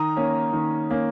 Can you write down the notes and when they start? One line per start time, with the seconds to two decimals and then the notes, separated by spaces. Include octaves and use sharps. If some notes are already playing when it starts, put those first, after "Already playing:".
Already playing: D#3 A#5 D#6
0.17 A#3 C#4
0.53 D#3
0.90 A#3 C#4